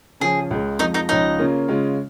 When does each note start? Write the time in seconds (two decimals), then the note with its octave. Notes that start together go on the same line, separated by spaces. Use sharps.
0.20 C#3 F3 C#4 G#4
0.51 C#2 C#3 G#3
0.79 F2 F3 G#3 D#4 D#5
0.94 D#4 D#5
1.09 C#2 C#3 F3 C#4 D#4 D#5
1.39 C#3 A#3 C#4 F4
1.68 C#3 G#3 C#4 F4